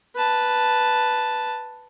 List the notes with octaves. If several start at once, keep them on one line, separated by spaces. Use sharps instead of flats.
B4 A5